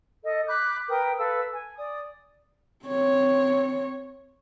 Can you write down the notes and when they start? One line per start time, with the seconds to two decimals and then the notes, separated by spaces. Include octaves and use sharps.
0.23 A4 D#5
0.47 B5 D6 F#6 G6
0.89 A#4 B4 G5 D#6
1.18 A4 B4 F5 E6
1.54 G#5
1.78 D5 D#6
2.86 C4 C#5